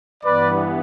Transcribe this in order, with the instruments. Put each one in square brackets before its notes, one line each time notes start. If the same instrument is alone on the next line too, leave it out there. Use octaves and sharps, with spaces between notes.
[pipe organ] G2 E3 B3 [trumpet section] B4 D5